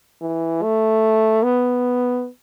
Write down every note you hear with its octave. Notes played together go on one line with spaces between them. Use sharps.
E3
A3
B3